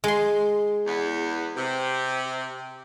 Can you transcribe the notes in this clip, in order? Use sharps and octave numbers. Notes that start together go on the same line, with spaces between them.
G#3 C6
E2 B3
C3